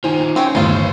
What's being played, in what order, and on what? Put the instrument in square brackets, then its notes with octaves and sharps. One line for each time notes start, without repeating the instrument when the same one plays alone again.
[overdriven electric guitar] D#3 F4 [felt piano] D#4 [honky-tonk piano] C5 G#5
[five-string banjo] C4 C#5 G5 [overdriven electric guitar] C#4
[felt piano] G1 D#2 [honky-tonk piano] A2 [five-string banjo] D#4 F4 [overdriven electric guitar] B4 C5